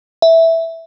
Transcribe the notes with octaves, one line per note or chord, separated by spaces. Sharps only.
E5